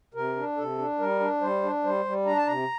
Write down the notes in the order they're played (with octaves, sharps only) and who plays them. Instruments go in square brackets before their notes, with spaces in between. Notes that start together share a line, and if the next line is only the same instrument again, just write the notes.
[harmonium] C3 A#4
D4
C3 A4
D4
G3 A#4
D4
G3 C5
D4
G3 C5
G3
D4 A#5
A5
C3 A#5